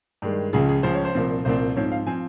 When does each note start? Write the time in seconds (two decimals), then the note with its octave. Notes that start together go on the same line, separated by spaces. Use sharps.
0.22 G2 D#3 G#3
0.53 C#2 C#3 F3 G#4
0.69 G#4
0.83 C#2 C#3 F3 C5
0.94 C#5
1.05 C5
1.15 C2 A#2 F3 C4
1.45 C2 A#2 F3 C4 C5
1.76 G#2 F3 C4 C#5
1.92 F5
2.06 F3 C4 G#5